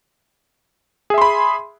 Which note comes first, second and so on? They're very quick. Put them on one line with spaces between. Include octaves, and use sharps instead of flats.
G#4 E5 C6 B5